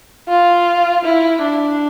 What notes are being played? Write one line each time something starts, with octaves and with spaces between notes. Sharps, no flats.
F4
E4
D4